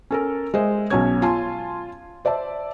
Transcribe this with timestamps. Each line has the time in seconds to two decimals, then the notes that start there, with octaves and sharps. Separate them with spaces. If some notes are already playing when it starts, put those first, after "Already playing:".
0.11 C#4 A4 A#4
0.54 G#3 G#4 C5 D#5 E5
0.90 B1 F#3 C#4 F#4 C#5 G#6
1.22 F4 G#5 A5 C6
2.25 C5 D5 E5 A5